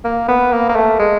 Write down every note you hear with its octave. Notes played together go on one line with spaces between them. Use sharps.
A#3
B3
A#3
A#3
A3
G#3